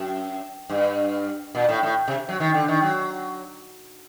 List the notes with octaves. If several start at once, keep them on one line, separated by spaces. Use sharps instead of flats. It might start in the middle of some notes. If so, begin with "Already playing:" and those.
Already playing: F#2
G2
A#2
A2
A2
C3
F#3
D#3
D3
D#3
F#3